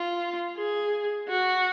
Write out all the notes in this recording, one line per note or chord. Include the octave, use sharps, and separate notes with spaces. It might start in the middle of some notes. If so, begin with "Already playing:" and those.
Already playing: F4
G#4
F#4